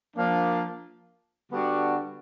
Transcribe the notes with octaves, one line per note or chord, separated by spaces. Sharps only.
F3 A#3 D4
D3 G3 B3 D4 F#4